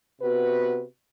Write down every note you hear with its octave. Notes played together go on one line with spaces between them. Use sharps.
C3 B3 F#4 B4